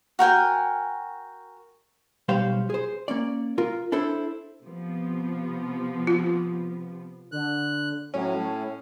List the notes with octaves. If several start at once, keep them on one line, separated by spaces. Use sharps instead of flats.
F#4 A#4 G5 G#5
B1 G3 G4 C5 C#5 F5
G#4 C5
A#3 C#4 D5
F4 A#4
D4 E4 A4 C5
C3 F3 B3
F4
D3 F#6
A2 F#3 C#4
A3